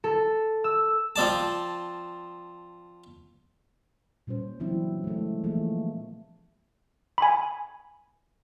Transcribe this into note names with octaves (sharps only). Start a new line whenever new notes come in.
A4
E6
F3 C4 D5 A5
A#2 G3 C#4 C5
C#3 E3 F#3 C4 D4 E4
G#3 A3
E3 F3 A3 A#3 G#4
G#5 B5